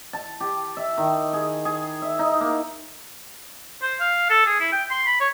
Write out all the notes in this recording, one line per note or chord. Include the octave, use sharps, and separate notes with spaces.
A5
G4
E5
D#3
G#4
G#4
E5
D#4
A#3
C5
F5
A4
G#4
E4
G5
C6
B5
C#5